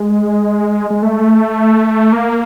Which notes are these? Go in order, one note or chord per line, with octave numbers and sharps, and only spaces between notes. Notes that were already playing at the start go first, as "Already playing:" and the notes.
Already playing: G#3
G#3
A3
A#3